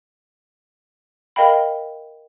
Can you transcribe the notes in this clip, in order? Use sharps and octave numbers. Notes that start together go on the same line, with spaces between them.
A#4 D#5 F5 G5 B5